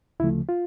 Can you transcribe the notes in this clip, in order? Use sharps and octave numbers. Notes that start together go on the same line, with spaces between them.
D2 C#3 F3 A3 E4
F4